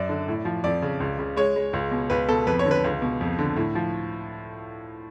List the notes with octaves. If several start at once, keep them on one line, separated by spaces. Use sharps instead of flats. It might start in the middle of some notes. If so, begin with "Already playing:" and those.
Already playing: F#2 D5
D3
A2
F3
F2 D5
C#3
C#2
C#3
G#3 C#5
G#3
C#2
B2
C#2 B4
B2 A4
F2 B4
C#5
D3
B4
C#2
B2
F2
D3
A2
F3